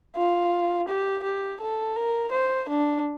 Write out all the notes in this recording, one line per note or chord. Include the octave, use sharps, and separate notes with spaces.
F4
G4
G4
A4
A#4
C5
D4